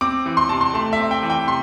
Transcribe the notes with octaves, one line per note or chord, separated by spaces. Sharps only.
C4 D6
E3
C6
C3 A5
C6
A3 A5
E5
C4
G5
E3
G5
C3 C6